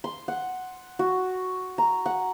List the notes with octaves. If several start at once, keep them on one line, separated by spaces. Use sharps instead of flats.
C6
F#5
F#4
A#5
F#5